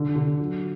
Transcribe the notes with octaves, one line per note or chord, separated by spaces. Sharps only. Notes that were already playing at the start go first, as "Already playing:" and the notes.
Already playing: D3
D3
F#3